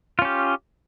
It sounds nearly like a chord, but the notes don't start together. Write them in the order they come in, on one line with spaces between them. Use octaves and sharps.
F4 C#4 G4